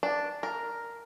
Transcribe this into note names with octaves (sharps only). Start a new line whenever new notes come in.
D4
A#4